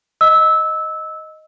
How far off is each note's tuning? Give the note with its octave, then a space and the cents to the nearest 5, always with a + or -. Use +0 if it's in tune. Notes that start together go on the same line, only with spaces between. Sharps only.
D#5 +0 E6 -15